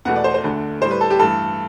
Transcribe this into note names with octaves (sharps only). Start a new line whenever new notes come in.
E2 B2 A3 F#5
D5
C5
C5
D2 D3 A3
A2 G3 C5
B4
A4
G4
G2 E3 A3 A4